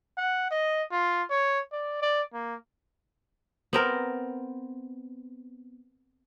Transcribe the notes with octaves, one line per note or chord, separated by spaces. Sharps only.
F#5
D#5
F4
C#5
D5
D5
A#3
B3 C4 A#4